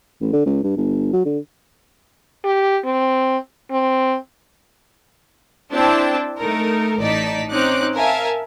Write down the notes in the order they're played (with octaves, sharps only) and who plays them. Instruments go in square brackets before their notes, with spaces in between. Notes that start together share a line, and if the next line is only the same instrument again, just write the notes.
[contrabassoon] A1
D3
C#2
G2
G1
F#3
D3
[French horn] G4
C4
C4
[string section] C4 D4 E4 C5 G5 A5
A3 D#4 A4 A#4
A1 A2 D#4 D5 A5 B6
C4 C#4 D#4 C#5 D6 F#6
A#4 E5 F5 G#5 A5